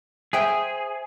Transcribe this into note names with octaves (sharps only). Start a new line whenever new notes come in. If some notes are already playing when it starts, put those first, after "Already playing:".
G#4 C5 E5 G5